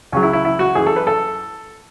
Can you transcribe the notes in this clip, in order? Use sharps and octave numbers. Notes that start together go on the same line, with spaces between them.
C#2 C#3 F#3 C#4
E4
E4
E4
F#4
F#2 E3 G#4
A4
B4
A4